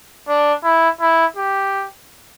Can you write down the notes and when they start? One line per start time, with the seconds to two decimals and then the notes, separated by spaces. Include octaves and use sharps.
0.28 D4
0.64 E4
1.00 E4
1.36 G4